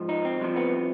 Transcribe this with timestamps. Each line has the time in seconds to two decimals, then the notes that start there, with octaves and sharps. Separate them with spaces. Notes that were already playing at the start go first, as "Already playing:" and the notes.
Already playing: G#2 F3
0.09 D#4
0.25 C4
0.40 C2 C3 F3
0.56 B3